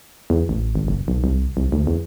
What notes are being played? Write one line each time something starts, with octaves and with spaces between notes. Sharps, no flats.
E2
A1
G#1
F#1
B1
C2
C2
D2
E2